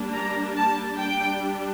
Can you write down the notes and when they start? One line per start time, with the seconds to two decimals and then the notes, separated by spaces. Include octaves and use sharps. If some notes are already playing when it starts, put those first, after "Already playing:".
Already playing: G3 A#3 D4
0.14 A#5
0.56 A5
0.99 G3 D4 G5